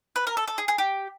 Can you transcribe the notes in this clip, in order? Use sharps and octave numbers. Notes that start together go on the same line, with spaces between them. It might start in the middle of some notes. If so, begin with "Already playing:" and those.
B4
A#4
A4
A4
G#4
G#4
G4